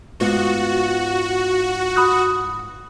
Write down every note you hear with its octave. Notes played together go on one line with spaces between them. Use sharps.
G#2 B3 F4 F#4
B5 D#6 F#6